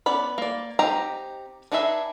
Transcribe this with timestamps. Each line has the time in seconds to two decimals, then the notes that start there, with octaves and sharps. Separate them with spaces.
0.06 B3 C#4 D5 B5
0.38 A#3 D5
0.79 C4 D#4 G4 A#5
1.72 D4 D#4 G#4 B4 E5